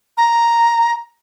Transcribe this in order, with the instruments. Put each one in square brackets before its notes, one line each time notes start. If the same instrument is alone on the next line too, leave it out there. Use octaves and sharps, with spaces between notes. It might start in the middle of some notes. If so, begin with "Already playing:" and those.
[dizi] A#5